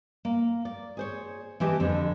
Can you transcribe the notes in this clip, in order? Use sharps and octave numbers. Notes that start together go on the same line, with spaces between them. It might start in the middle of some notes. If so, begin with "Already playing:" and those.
A#3
D5
G#4 C5 C#5
E3 C4 G4 D#5 A5
F2 D3 C4